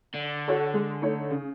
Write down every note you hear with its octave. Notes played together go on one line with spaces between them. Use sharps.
D3
F#4 A4 C#5
G#3
A3 D#4 C#5
C#3